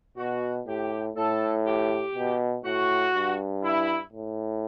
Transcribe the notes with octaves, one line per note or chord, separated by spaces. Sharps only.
B2 F#4
A2 G4
A2 A4
G4
B2
A2 F#4
G2
E4
A2